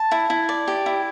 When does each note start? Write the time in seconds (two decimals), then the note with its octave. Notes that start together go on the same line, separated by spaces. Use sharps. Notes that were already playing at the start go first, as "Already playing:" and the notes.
Already playing: A5
0.11 E4
0.30 E4
0.49 D5
0.68 G4
0.86 E4